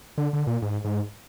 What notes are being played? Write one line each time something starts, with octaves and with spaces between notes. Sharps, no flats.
D3
D3
A#2
G#2
G#2